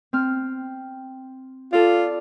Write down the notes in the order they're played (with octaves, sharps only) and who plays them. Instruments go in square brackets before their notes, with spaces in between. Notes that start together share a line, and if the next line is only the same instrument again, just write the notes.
[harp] C4 F6
[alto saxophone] F4 [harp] A4 D5